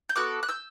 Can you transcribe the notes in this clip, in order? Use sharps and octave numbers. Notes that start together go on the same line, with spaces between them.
G6
B3 F#4 A4 D6 F#6
F#6
E6 G6